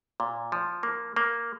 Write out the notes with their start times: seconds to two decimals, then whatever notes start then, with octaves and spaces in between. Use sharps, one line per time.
0.20 A#2
0.52 F3
0.83 A#3
1.16 A#3